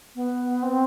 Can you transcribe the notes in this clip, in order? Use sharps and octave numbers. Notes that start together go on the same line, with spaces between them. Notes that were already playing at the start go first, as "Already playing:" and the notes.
B3
C4